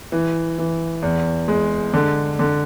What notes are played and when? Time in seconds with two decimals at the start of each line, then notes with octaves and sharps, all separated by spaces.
0.12 E3
0.58 E3
1.02 E2
1.48 G#3
1.93 D3
2.39 D3